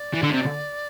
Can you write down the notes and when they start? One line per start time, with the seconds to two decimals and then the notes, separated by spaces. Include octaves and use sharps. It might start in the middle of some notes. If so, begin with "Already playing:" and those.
Already playing: D5
0.14 E3
0.23 D3
0.31 C3